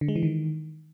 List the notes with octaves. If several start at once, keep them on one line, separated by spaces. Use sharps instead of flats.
D3
G#3
E3
D#3